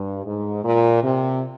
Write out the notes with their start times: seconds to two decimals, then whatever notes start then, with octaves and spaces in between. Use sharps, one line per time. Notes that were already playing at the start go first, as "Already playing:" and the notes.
Already playing: G2
0.24 G#2
0.63 A#2
1.01 C3